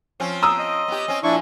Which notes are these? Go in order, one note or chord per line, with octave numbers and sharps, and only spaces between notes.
F3 C4 C#4
A#5 D#6 E6
D#5
B3 G4
C4 C#4
A#2 F3 D4 E4 C#6